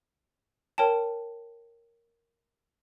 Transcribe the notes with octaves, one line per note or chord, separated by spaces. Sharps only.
A#4 C#5 G5 A5